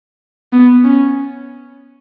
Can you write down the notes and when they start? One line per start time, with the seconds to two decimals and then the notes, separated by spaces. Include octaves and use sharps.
0.53 B3
0.84 C#4